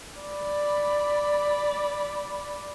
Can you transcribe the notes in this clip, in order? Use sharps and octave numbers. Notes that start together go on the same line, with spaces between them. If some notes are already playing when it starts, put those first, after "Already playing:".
D5 B5